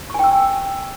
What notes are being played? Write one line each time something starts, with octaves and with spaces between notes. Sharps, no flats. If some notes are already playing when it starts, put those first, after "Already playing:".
G5 G#5 C#6 E6